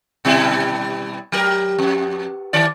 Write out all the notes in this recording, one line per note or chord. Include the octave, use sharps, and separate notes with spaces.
B2 G3 E4
F#3 G4 A#4
F2
D#3 D5